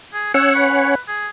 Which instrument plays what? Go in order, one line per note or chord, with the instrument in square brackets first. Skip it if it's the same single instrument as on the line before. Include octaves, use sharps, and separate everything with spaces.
[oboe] G#4
[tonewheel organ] C#4 C#5 F#5 [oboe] E6
[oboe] B4
G#4